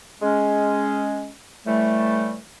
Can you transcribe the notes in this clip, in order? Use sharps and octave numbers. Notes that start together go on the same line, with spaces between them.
G#3 C#4
A2 E3 G3 A3